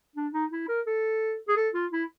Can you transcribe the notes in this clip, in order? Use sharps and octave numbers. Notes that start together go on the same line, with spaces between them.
D4
D#4
E4
A#4
A4
G#4
A4
F4
E4